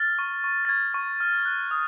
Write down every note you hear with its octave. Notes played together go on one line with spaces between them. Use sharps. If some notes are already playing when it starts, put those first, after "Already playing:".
Already playing: F6 A6
C#6
C#6
A6
C#6 G#6
C#6
F6
F#6
D#6